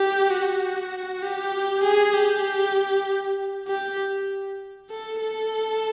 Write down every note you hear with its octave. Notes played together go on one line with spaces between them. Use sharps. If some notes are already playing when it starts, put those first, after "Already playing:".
Already playing: G4
F#4
G4
G#4
G4
G4
A4
A4